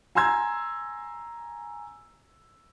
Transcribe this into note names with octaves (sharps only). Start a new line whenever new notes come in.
G#5 A#5 C6 E6 G#6